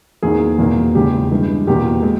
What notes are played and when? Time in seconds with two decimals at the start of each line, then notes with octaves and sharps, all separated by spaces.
0.22 E2 D#3 A#3 G#4
0.58 E2 B2 A#3
0.94 E2 C#3 G#3 G4
1.31 G2 E3 G#3
1.67 E2 B2 A#3 G4
2.03 G#3